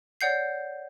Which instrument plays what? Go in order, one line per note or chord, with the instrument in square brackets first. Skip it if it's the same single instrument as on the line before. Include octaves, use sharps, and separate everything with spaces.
[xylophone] C#5 D5 F#5 G6 C7